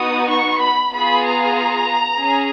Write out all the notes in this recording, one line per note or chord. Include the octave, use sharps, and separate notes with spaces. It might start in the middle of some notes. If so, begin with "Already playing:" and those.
Already playing: B3 D#4 F#4 D#6
C#6
B5
B3 F4 G#4 B5
A#5
C#4 G#4